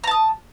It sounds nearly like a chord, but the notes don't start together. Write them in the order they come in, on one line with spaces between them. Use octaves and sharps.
A#5 A5 D#6